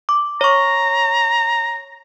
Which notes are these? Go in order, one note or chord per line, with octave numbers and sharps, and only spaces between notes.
D6
C#5 A#5 C#6